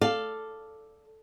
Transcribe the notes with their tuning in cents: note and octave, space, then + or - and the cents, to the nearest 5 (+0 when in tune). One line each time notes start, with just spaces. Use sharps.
A4 +0 D5 +0 F5 +0